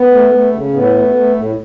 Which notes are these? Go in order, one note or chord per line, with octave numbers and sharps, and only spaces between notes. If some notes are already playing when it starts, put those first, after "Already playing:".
Already playing: B3
A3
A3
C#3
A2 B3
A3
A3
A2